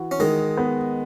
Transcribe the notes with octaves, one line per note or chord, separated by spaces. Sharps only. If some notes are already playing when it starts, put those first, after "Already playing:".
Already playing: E3 F#4
C#4
D#3 G#3 D#4
B3